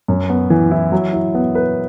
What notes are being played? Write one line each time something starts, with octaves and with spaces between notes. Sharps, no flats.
F#2
B3
E3
E4
F#3
E4
B3
B4